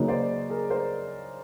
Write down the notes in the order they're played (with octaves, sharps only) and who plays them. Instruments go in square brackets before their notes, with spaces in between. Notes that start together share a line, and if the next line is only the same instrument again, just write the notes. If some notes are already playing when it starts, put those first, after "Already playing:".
Already playing: [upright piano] C#3 F#3 A#3 D#4 [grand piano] B4 C#5
[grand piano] C5 D5
G#4 A#4
A#4 C5